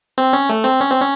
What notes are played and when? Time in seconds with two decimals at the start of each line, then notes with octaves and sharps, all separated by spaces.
0.18 C4
0.33 C#4
0.50 A3
0.64 C4
0.81 C#4
0.91 C4
1.00 C#4